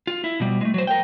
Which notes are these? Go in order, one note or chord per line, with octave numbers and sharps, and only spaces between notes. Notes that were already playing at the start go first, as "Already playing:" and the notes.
F4
E4
B2 G3
G#3 A3
F#3 C5
A#4 G5